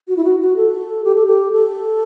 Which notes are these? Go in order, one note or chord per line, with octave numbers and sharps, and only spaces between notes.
F#4
E4
F#4
F#4
A4
G4
A4
G4
A4